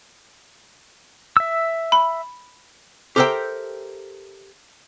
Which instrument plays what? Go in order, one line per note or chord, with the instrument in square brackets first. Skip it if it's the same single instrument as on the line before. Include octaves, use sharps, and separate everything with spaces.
[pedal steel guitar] E5 E6
[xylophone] B5
[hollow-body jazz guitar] G4 A4 A#4 C5 E5 G5